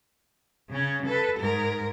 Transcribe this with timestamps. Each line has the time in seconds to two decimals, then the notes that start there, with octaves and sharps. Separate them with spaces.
0.70 C#3 C#4
1.06 A4 B4
1.40 G#2 A#4